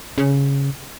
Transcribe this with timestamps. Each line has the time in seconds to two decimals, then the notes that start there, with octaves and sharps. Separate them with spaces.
0.18 C#3